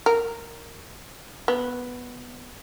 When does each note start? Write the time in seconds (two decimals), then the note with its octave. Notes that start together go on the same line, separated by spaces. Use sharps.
0.06 A#4
1.48 B3